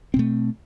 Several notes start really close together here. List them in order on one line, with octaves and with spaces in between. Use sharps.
C4 B2 A3